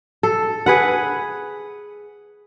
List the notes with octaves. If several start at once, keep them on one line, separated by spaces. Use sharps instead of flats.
A4
G#4 B4 F#5